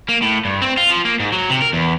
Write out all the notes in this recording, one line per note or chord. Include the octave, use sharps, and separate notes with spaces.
A#3
A2
G2
C4
F4
F3
A#3
G#2
F#3
C3
A#4
E2